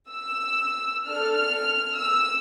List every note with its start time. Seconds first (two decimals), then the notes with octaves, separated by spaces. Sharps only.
0.11 E6
1.05 D4 A4 F6
1.36 F6
1.97 E6